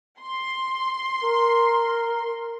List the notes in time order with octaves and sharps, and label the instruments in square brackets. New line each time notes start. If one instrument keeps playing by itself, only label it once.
[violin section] C6
[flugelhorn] A#4